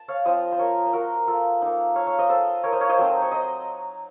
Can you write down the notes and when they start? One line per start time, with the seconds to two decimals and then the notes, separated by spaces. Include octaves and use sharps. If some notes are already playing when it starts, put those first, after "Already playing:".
Already playing: A5
0.08 C#5 F5
0.25 F3 C4 F4 C5 D#5
0.52 C5
0.59 A#4 C#5
0.86 C5
0.93 F#4 A#4
1.27 F4 A4
1.62 A#3 D#4
1.96 C#5 F5
2.07 C#5 F5
2.19 C5 D#5
2.29 A4 C5
2.63 A#4 C#5
2.72 C5 D#5
2.81 C#5 F5
2.89 C5 D#5
2.98 F#3 A3 C4 D#4
3.22 C#5
3.32 C5 D#5